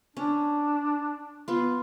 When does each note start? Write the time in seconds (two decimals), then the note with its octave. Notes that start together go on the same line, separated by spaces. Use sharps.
0.17 C#4 D4
1.48 B3 F4